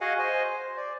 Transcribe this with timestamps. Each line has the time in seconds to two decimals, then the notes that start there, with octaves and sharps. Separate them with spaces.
0.01 F#4 G#4 D#5 F5 F#5 G#5
0.19 C5 D#5 G#5
0.44 C5
0.77 D5